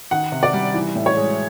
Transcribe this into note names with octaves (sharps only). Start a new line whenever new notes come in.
D#3 F#5
C3
D5
G3
E3
A2
C#5
G#3